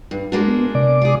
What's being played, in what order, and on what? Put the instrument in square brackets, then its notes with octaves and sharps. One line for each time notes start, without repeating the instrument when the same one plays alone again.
[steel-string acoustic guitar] G2
[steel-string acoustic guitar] G#3 A#3 D4 [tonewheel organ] F#4
[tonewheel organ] B3
C3 D5 D6
[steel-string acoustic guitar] F4 G#4